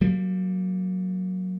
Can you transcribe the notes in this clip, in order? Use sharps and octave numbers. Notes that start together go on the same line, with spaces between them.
F#3 G3 A#3